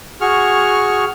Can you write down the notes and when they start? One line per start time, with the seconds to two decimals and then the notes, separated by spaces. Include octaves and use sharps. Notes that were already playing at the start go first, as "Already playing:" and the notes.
0.21 F#4 G#4 C#6 F6